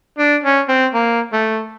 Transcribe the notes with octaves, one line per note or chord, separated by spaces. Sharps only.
D4
C#4
C4
A#3
A3